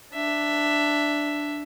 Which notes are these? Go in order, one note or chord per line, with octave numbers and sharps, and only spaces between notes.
D4 E5